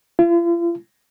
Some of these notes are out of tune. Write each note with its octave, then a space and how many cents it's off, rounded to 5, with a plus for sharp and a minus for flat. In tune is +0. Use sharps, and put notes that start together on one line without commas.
F4 -45